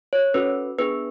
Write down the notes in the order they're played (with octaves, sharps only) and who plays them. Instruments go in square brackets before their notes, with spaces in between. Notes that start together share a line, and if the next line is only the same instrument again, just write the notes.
[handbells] C#5
C#4 F#4 A4 B4
B3 D4 G#4 B4